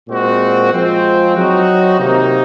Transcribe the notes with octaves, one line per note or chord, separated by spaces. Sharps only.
A#2 G#3 C4 F#4
F3 G#3 C4
F#3 C4 D#4 F#4
C3 D#3 A#3 D#4